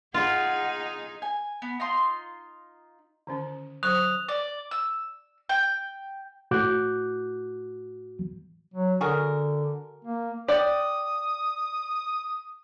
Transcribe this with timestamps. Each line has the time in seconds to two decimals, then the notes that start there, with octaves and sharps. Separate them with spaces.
0.14 D#4 F4 G#4 F#5
1.22 G#5
1.62 B3
1.80 D#4 F4 C6
3.27 D3 D#3 C#4
3.83 F#3 C5 C#6 D#6 F#6 F7
4.29 D5
4.71 E6
5.49 G5
6.51 A2 F#4 D6 F#6 G6
8.74 F#3
9.01 D3 F#4 G#4 A#4
10.05 A#3
10.48 D5 F#5 G5 D#6